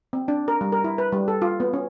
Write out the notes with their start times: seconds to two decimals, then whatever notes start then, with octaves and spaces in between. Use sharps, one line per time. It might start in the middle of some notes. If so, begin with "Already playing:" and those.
0.13 C4
0.28 D4
0.48 A#4
0.61 G3
0.72 A#4
0.84 E4
0.98 B4
1.12 G3
1.28 A4
1.42 F4
1.60 B3
1.73 C#4